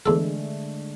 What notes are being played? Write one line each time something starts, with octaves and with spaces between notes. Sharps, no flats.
E2 D3 G#3 A3 A4